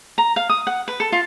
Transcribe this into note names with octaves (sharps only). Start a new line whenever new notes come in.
A#5
F5
D#6
F#5
B4
A4
F4